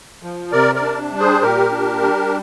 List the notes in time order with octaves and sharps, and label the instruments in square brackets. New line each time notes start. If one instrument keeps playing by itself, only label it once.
[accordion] F3
C3 A#4 D5
A#4 D5
D4
G3
G#4 C5
A#2 G4 A#4
D4
G3